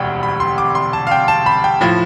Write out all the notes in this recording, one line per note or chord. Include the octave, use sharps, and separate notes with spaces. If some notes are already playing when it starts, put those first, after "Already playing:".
Already playing: E1 D2 C3 G3 G5 B5
B5
C6
D6
C6
A5
F5
G5
A5
B5
G5
A2 F3